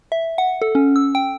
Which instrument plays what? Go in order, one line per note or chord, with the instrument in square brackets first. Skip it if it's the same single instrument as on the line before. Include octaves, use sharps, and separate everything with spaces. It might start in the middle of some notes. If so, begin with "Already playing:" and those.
[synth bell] E5
F#5
A4
C#4
E6
G5